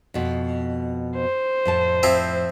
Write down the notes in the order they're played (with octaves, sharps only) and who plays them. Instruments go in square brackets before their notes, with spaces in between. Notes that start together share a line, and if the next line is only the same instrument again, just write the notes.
[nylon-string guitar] F2 B2
[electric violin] C5
[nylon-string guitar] F2 A2 A5
[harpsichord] F3 C4 E4